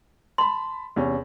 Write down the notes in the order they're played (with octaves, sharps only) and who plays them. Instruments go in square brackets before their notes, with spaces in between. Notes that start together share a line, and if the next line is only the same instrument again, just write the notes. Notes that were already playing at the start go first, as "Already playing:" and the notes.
[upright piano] A5 B5 [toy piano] C6
[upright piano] E2 C3 C#4